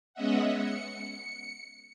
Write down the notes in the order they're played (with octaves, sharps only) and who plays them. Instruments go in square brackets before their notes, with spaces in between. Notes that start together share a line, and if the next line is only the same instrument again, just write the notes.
[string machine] G#3 B3 C#4 D#5 E5 F#5
C#7